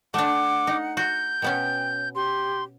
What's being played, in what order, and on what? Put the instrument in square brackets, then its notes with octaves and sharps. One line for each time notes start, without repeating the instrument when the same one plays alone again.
[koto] A3 D4 [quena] F#5 [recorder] D6
[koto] D#4
[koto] F#4 [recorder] G6
[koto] B2 B3 C#4 [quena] G5
[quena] G4 [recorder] C6